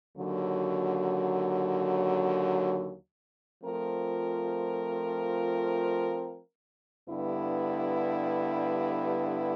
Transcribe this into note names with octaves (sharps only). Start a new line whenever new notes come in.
D#2 D3 F#3
F3 A3 C4 F4 A#4
G2 D3 G3 B3 E4